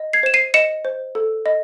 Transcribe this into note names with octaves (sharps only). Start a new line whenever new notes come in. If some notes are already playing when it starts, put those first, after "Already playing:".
Already playing: D#5
G#6 C7
C5 E7
C7 D#7
D#5 C#7 E7
C5
A4
D#5